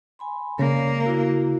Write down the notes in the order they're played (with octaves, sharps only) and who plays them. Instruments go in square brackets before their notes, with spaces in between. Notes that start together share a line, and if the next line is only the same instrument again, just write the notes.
[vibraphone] G#5 B5 C6
[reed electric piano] C#3 [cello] A#3 [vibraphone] C#5 D5
[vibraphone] E4 F#4